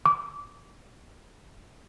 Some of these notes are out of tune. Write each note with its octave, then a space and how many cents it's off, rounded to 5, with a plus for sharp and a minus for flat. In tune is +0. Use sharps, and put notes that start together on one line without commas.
D6 -25